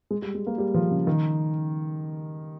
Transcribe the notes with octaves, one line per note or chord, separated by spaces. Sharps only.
G#3
G3
G#3
A#3
G3
F3
C#3
D#3